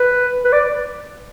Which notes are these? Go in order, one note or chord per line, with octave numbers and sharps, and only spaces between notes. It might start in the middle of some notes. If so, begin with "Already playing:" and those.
Already playing: B4
B4
D5